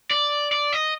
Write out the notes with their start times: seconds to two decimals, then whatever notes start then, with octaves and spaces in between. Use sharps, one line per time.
0.11 D5
0.52 D5
0.73 D#5